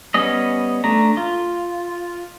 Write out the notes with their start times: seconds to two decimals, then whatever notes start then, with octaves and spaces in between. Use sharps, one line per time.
0.14 G3 B3 C#4 D#5
0.84 A3 D4 A#5
1.17 F4